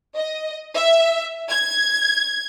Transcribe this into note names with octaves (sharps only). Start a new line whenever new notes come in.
D#5
E5
G#6